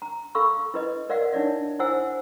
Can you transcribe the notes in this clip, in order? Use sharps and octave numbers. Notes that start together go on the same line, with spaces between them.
A#5
A4 F5 B5 C#6 E6
E4 B4 D#5
A#4 D5 D#5 F5 F#5
D4 D#4 C#5 D5 E5
E4 C5 F#5 G#5 E6